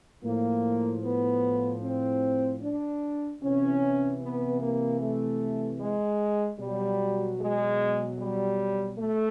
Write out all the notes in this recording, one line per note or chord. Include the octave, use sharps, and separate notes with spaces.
A2 F3 A#3
B3
C4
D4
C3 E3 C#4
B3
A#3
A3
G#3
B2 F#3 G3
G#3
G3
A3